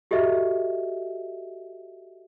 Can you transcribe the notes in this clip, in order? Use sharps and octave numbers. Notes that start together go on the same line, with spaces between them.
F#4 G4 A4 D#5 E5